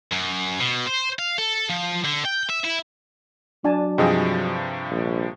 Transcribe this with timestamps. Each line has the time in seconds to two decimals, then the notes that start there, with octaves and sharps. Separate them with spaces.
0.12 F#2
0.61 B2
0.87 C5
1.19 F5
1.38 A4
1.70 F3
2.05 D3
2.25 G5
2.50 E5
2.65 E4
3.64 F#3 D4 G#5 A5
3.98 G2 C3 F3 G#4 D#5 G5
4.91 A#1